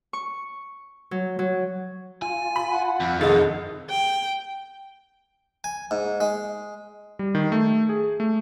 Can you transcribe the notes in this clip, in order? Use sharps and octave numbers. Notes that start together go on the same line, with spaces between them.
C#6
F#3
F#3
F4 G#5
B5
F#5
F2
C2 D#3 D#4 G#4 A4 A6
G5
G#5
G#2
G#3
G3
D#3
A3
G#4
A3